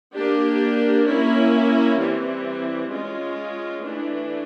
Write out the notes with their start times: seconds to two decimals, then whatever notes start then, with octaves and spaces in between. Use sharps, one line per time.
0.14 A#3 D4 G4
1.05 A#3 C#4 E4
1.98 E3 G3 C4
2.89 G#3 C#4 F4
3.81 E3 A3 D4